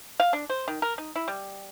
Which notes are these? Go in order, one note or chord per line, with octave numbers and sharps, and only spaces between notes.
F5
D4
C5
D#3
A#4
D#4
E4
G3